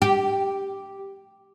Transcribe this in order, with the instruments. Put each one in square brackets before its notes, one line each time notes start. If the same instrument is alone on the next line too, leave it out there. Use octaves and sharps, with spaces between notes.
[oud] G4